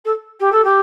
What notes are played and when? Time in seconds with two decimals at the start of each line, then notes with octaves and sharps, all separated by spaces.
0.05 A4
0.40 G4
0.52 A4
0.64 G4